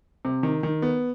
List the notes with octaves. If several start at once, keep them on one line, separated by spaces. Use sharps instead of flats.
C3
D#3
D#3
B3